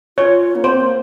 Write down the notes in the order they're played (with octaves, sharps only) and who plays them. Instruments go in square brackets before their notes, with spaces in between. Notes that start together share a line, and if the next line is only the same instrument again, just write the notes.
[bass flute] F4 [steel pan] C#5
[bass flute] A#3
[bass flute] C4 [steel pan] C5
[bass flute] A#3